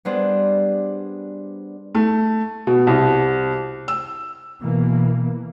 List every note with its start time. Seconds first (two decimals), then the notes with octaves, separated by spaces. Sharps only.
0.05 G3 B3 D4 G#4 C5
1.95 A3
2.67 B2
2.87 C2
3.88 E6
4.61 B2 E3 A#3